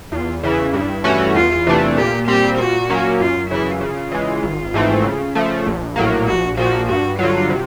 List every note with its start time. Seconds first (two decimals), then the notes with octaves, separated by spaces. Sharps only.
0.12 E2 F4
0.43 C#3 E3 E4
0.74 G2 E4
1.04 E3 A3 C#4 F#4
1.35 E2 F4
1.67 C3 E3 A3 D4
1.97 A#2 G4
2.28 G3 C4 G4
2.58 A#2 F#4
2.90 F#3 A#3 C#4
3.20 F#2 F4
3.50 C#3 E3 E4
3.81 C#3 F4
4.11 E3 G#3
4.43 G#1
4.74 G#2 E3 A3 C4
5.04 C#3
5.35 F3 A3
5.66 A#1
5.96 A2 F#3 A#3
6.27 A#1 F#4
6.57 A#2 F3 F#4
6.89 G2 F#4
7.19 D3 F#3 F4
7.50 C3